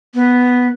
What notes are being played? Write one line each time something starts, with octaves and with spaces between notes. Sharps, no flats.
B3